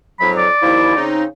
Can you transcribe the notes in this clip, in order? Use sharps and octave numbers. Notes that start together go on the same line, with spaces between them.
F2 G#2 F#3 B5
D5
D#2 F3 E4
C#3 C4 D#4